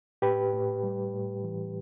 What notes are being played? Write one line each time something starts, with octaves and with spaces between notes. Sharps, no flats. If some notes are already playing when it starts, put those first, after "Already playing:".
A2 G4 B4
A2
G3
A2
E3